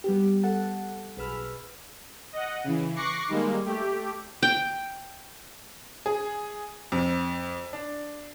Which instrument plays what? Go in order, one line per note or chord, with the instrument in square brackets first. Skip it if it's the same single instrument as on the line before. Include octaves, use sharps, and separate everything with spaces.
[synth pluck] G3 B3 G4
A4 F#5 A5
B1 G#4 B4 B5 E6 F6
[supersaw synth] D#5 F#5
C#3 E3
C#6 D6 F#6 A#6 C7 C#7
D#3 G3 G#3 A#3
A3 G4
[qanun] G5
[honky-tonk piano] G#4
F2
D4